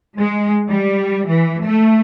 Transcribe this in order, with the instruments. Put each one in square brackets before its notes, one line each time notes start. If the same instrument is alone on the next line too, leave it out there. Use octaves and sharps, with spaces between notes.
[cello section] G#3
G3
E3
A3